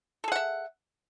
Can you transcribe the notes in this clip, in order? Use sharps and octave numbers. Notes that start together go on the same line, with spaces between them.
G#4 A4 E5 F#5